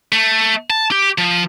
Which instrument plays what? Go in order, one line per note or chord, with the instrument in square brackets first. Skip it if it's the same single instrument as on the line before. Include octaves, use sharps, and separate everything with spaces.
[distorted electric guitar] A3
A5
G4
F3